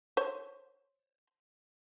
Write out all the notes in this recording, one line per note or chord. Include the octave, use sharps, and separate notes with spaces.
C5 C#5